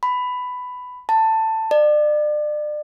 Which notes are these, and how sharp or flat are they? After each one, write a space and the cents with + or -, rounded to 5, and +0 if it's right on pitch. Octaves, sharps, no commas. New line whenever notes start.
B5 +10
A5 +15
D5 +35